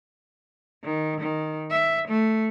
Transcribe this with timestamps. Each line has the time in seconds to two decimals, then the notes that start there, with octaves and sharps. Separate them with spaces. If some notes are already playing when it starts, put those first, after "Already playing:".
0.84 D#3
1.20 D#3
1.71 E5
2.08 A3